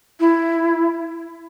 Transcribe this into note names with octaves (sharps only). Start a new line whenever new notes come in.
E4